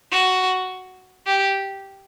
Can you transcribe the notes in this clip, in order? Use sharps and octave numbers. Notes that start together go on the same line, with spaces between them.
F#4
G4